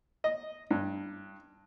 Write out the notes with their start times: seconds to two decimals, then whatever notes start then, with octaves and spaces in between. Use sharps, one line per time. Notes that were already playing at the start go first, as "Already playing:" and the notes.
0.24 D#5
0.71 G2